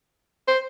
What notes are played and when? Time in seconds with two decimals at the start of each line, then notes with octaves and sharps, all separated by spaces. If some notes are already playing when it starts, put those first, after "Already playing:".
0.48 C5